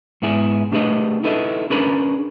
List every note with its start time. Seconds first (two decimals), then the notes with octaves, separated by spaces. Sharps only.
0.22 G#2 B3 E4 G#4
0.72 A3 D4 G4 G#4 B4 D#5
1.23 D#4 E4 A4 B4 D#5
1.70 C#4 D4 G#4 A#4 B4 B5